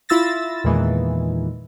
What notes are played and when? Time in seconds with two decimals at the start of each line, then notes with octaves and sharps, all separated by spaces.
0.09 E4 F4 E6 A6 A#6
0.64 E2 A#2 D#3 E3 G#3